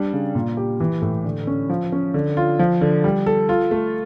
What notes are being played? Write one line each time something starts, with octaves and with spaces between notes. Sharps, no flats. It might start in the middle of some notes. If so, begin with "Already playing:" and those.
Already playing: G3 D4
C#3
A#2
G4
E3
A2
D3
C#4
F3
C#4
D3
F4
F3
D3
G3
A4
F4
A3